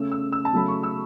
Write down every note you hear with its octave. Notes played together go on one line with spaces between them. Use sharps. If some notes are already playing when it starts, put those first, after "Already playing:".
Already playing: C#3 A3 C#4 E6
E6
E6
A5
C#3 F#3 A3 C#4 B5
C#6
E6